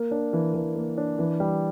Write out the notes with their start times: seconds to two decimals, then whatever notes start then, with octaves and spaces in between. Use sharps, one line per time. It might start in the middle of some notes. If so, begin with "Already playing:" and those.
Already playing: A#3
0.11 D4
0.33 E3
0.54 E3
0.76 A#3
0.97 D4
1.19 E3
1.40 G3